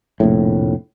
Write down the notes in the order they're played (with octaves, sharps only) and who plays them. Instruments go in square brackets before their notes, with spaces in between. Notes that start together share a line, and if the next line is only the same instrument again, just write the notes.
[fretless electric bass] F1 A#1 A2